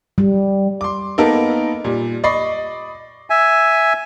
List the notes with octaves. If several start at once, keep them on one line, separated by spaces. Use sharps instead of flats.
G3
C6 D6
A#3 B3 D#4 A4 A#4
A#2 G3
D5 D#5 B5 C#6 C7
E5 G#5